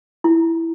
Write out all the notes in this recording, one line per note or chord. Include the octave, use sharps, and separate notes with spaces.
E4